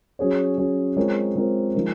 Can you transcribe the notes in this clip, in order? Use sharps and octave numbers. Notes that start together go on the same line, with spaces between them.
F#3 C#4 G#4 C#5
F#3 C#4 G#4 C#5
G#3 C4 F4 A#4 C#5
G#3 C4 F4 A#4 C#5
F3 G#3 D#4 A#4